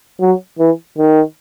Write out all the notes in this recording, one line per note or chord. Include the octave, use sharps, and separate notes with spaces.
F#3
E3
D#3